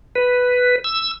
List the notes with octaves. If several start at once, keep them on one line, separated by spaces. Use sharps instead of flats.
B4
E6